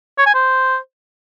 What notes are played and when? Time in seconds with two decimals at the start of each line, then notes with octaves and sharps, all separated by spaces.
0.18 C#5
0.26 G#5
0.35 C5